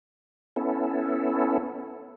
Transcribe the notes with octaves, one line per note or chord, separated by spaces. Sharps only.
B3 C#4 E4 A4